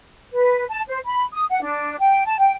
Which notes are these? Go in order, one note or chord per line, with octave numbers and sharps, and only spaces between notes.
B4
A5
C5
B5
D#6
F#5
D4
G5
A5
G5